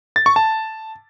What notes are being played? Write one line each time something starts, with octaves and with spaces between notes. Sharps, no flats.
A6
C#6
A5